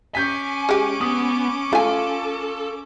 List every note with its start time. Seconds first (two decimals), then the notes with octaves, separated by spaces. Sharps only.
0.15 C#4 G#5 D6 G6 B6
0.69 G#3 G4
1.01 B3 D#6
1.73 A3 F4 A4 G#5